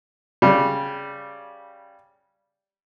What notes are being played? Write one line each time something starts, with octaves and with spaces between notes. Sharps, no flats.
C#3 G3